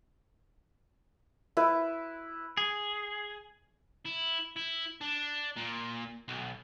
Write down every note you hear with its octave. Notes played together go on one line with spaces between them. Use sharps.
E4 B4
G#4
E4
E4
D4
A#2
B1